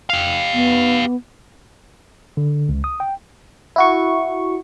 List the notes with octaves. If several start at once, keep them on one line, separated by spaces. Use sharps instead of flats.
G4 F5
B3
D3
C#2
D#6
G5
E4 F#4 C#6